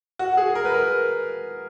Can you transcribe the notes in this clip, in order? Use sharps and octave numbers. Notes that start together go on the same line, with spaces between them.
F#4
G#4
A#4
B4
A#4